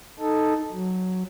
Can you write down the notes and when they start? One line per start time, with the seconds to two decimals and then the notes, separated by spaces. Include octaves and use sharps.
0.20 D#4 A4
0.72 F#3